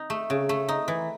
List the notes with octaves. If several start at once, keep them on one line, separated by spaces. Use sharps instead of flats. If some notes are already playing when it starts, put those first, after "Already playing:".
Already playing: D#4
A3
C#3
A3
D#4
E3